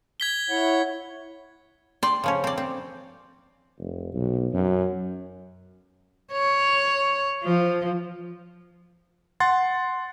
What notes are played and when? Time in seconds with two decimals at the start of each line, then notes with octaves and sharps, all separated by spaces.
0.20 G#6 B6 G7
0.50 E4 C#5 F#5
2.03 D5 G5 C6
2.24 C#3 F3 C#4
2.44 C4 D5
2.58 C4
3.78 F1
4.13 B1
4.53 F#2
6.32 C#5
7.44 F3
9.40 F#5 C6 A6